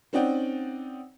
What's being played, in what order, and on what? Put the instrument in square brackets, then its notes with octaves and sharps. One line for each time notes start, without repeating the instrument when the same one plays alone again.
[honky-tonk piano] C4 C#4 D#4 D5 F#5 G5